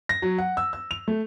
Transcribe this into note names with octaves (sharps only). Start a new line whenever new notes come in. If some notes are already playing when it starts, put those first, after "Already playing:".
A#6
F#3
F#5
E6
E6
F7
A3